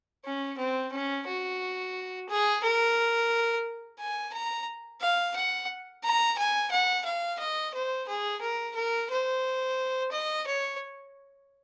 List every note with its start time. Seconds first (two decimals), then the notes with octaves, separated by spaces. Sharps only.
0.25 C#4
0.58 C4
0.92 C#4
1.27 F#4
2.29 G#4
2.63 A#4
3.99 G#5
4.34 A#5
5.01 F5
5.36 F#5
6.04 A#5
6.38 G#5
6.71 F#5
7.05 F5
7.39 D#5
7.74 C5
8.08 G#4
8.41 A#4
8.75 A#4
9.10 C5
10.12 D#5
10.47 C#5